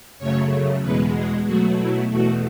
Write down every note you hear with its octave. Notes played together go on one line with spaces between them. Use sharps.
F#2 C#3 F#3 A3 C#5
E2 B2 G#3 B4
G#4
B2 F#3 A3 F#4
E4
E2 B2 A3 F#4